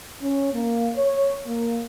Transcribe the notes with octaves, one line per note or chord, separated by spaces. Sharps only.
C#4
A#3
C#5
A#3